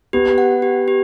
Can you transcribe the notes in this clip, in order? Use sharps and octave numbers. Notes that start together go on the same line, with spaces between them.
B3 G4
F#5
G4
G4